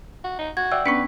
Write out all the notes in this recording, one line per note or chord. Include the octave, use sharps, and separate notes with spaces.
F#4
D#4
F#4 G#6
D5 E5 F#5 G5 E6
B3 C#4 D4 B4 C#6 B6